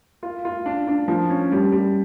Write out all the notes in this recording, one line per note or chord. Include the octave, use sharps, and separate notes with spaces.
F4
F4
D4
D4
F3
C#4
G3
G3